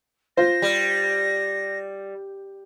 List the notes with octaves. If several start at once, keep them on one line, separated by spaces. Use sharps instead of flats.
F4 C5 A#6
G3